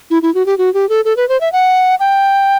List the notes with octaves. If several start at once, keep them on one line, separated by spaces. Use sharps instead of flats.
E4
E4
F#4
G4
F#4
G4
A4
A4
B4
C5
E5
F#5
G5